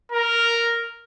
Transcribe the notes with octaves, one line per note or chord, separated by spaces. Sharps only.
A#4